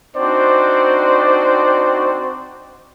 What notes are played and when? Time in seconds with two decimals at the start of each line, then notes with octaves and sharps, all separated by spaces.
0.17 C4 D4 D#4 F#4 C5 D5